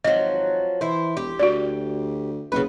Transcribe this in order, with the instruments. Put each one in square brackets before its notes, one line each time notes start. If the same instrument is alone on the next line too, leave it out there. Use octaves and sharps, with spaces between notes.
[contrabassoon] G#1 [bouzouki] F3 F#3 [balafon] D#5
[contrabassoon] E3 [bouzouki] E4 C5
[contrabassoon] E1 [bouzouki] G4
[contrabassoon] D2 [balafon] F#4 D5
[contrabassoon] F#1 [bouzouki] C#3 B3 B4